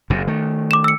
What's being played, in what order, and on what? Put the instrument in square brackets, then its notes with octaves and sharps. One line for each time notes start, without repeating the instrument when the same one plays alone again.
[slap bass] F#1 F#2 C3
D#3 A3
[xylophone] D6 E7
E6 C#7